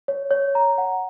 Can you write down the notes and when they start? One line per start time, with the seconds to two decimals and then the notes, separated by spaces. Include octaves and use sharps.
0.08 C#5
0.31 C#5
0.55 A#5
0.78 F#5